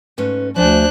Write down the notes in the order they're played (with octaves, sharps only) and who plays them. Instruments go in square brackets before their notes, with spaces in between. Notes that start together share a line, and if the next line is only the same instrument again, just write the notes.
[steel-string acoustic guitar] G#2 A3 C#4 [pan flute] B4
[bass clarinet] D2 [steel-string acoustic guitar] F3 A3 G#5 [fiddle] D4 F#6 [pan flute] C5